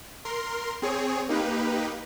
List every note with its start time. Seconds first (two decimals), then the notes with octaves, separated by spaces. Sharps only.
0.25 A#4 C6
0.82 C4 G#4 C#5
1.29 A#3 D#4 G4 B4